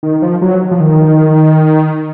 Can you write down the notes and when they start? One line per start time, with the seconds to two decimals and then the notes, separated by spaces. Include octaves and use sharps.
0.03 D#3
0.22 F3
0.42 F#3
0.71 F3
0.80 D#3